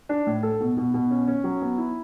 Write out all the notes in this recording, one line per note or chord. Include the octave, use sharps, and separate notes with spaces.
D4
A2
A4
B2
B2
B2
C#4
C#4
F#3
B3
E4